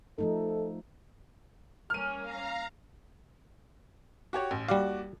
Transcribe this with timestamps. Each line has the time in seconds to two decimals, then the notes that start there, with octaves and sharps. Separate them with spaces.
0.18 F3 A3 D#4 A4
1.90 G3 A#3 C#4 F6 D#7
2.22 F5 A#5
4.33 F#4 G4 C#5
4.51 A1
4.68 D#2 G3 F#4 D5 F5